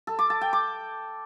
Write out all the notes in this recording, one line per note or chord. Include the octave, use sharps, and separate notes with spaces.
A4
D6
A5
G5
D6